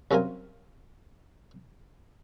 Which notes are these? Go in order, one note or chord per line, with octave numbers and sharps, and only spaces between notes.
C2 F#2 C4 F4 A#4 G#5